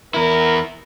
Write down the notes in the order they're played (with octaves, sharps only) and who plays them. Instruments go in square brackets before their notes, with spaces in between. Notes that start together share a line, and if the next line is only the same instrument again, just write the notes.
[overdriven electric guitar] E2 E4 [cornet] A#4